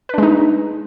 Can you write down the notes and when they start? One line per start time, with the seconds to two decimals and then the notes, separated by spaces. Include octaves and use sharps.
0.09 B4
0.14 D4
0.18 G#3
0.23 D#4